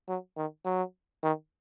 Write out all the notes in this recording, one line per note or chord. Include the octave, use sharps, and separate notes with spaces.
F#3
D#3
F#3
D#3